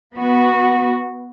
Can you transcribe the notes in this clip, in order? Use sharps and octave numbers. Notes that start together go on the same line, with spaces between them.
B3 F#4